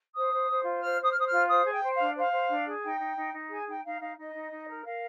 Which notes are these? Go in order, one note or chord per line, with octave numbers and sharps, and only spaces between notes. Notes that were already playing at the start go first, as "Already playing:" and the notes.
C5 D#6
C5
C5
F4
C5 F6
C5
D#6
F6
C5 D#6
F6
F4
C5 D#6
G#4
G5
C5
D4 F5
C5 F5
C5
D4
G#4
D#4 G5
D#4
D#4
D#4
G#4 G#5
D#4 G5
D#4 F5
D#4 F5
D#4 D#5
D#4
D#4
A#4
A#4 F5